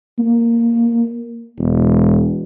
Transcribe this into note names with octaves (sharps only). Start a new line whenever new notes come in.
A#3
E1